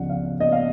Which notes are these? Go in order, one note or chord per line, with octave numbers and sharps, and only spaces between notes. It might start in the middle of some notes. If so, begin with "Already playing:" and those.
Already playing: C#2 C#3 F3 F#5
F5
D#5
F5